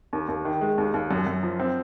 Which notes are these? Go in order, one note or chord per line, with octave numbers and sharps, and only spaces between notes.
D#2
D#2
D#3
G#3
D#2
D#2
F#2
F#2
F3
C4